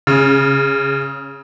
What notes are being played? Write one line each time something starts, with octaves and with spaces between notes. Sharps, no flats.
C#3